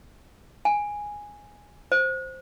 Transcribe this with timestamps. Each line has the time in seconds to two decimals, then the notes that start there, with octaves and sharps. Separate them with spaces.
0.65 G#5
1.92 C5